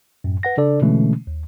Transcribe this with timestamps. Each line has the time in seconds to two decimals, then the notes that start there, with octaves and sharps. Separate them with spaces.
0.24 F#2 A2
0.43 B4 F#5 A#6
0.57 C#3 D4 A4 D5
0.82 B2 D3 E3 G#3 A3 C#4
1.27 D#2